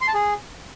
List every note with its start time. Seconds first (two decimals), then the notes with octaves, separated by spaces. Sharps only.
0.01 C6
0.08 A5
0.14 G#4